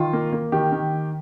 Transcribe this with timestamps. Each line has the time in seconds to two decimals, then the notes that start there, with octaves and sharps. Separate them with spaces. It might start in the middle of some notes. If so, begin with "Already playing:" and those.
Already playing: D#3 F4
0.13 A#3
0.33 A#3
0.52 D#3 G4
0.72 D#3